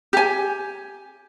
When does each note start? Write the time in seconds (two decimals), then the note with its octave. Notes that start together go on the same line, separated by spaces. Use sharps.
0.13 G4 G#5